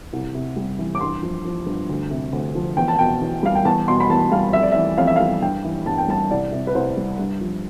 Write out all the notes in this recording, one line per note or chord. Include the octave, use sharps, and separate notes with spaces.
C2
C3
G3
E3
D6
G2 C6
F3
F3
G2
D2
C3
D2
F3
E2 G5
A5
B2 G5
E2
G3 F5
G5
E2 A5
B2 C6
B5
E2 A5
G3 F5
F2 E5
D5
E5
E3
F2 F5
E5
F5
G3
G2 G5
E3
G2 A5
G5
G3 A5
C2 D5
C3
B4
C2 C5
G3
G2
F3